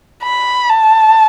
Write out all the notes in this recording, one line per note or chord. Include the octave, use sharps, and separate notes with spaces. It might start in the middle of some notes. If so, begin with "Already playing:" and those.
B5
A5